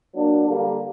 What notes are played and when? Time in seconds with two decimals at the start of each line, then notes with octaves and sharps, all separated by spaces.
0.15 F#3 A#3 D4
0.47 D3 G3 A#3